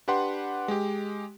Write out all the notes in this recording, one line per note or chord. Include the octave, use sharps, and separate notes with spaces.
D4 G4 B4 F#5 C6
G#3 G4